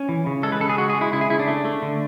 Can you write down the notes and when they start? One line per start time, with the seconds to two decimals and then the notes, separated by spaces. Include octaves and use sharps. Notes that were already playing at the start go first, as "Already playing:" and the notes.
Already playing: C#4
0.09 E3
0.26 C#3
0.43 G#3 A4
0.52 B4
0.60 C#3 A4
0.69 G#4
0.78 G#3 F#4
0.90 G#4
0.95 G#3
1.01 E4
1.13 C#3 E4
1.21 G#4
1.30 C#3 E4
1.39 D4
1.48 A3
1.65 A3
1.82 D3